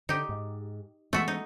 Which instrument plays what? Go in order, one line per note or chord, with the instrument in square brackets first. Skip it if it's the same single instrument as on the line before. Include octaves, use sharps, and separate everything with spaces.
[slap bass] D3 [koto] D#4 G4
[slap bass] G#2
[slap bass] E3 G#3 B3 [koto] A3 F#4 E5
[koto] D#4